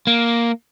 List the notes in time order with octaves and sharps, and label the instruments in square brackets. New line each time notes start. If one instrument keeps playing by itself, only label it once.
[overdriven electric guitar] A#3